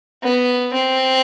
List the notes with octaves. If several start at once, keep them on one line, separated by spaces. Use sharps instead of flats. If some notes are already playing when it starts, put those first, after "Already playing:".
B3
C4